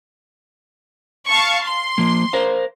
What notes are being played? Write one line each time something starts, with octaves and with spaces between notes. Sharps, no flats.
F5 A5 C#6
C6
F3 A#3
A#4 C5 F5